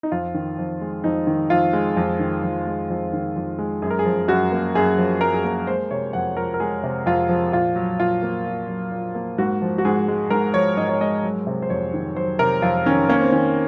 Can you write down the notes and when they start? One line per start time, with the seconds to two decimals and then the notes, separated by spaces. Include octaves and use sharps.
0.03 D#4
0.12 F2 F4
0.34 D#3
0.58 F2
0.81 G#3
1.04 F2 D#4
1.27 D#3
1.50 F2 F4
1.73 G#3
1.97 F2
2.20 D#3
2.43 F2
2.67 G#3
2.90 F2
3.13 D#3
3.36 F2
3.58 G#3
3.82 F#2 G#4
3.90 A#4
3.99 G#4
4.05 F3
4.28 F#2 F#4
4.52 A#3
4.75 F#2 G#4
4.98 F3
5.21 F#2 A#4
5.34 G#4
5.44 A#3 A#4
5.67 G#3 C5
5.91 C3 C#5
6.13 F2 F#5
6.37 F3 A#4
6.54 A#4
6.60 G#3 G#4
6.83 C3
7.06 F2 F4
7.29 F3
7.53 A#2 F4
7.76 F#3
8.00 A#2 F4
8.23 A#3
8.46 A#2
8.68 F#3
8.92 A#2
9.15 A#3
9.38 G#2 F#4
9.62 F3
9.78 F#4
9.85 G#2 G#4
10.08 G#3
10.30 G#2 A#4
10.54 F3 C#5
10.77 G#2 D#5
10.89 C#5
11.01 G#3 D#5
11.24 F#3
11.47 C3
11.62 C5
11.70 F2 C#5
11.94 D#3
12.16 F#3 C5
12.39 C3 A#4
12.62 F2 F4
12.86 D#3 C#4
13.09 A#3 C#4
13.21 C4
13.32 D#3 C#4